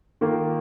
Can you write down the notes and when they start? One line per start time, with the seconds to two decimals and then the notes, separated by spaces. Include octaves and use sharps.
0.21 D#3 A#3 F4